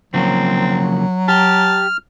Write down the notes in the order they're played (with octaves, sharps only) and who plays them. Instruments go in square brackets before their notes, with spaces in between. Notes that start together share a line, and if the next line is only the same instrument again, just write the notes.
[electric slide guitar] C#3 F3 A#3 [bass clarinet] F#3 [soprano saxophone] C4
[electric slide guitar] G4 [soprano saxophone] A5 [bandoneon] F6